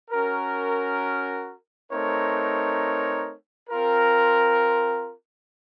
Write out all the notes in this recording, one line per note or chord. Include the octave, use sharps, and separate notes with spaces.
C#4 F#4 A#4
A3 C4 D#4 A#4 C#5
C4 F4 A#4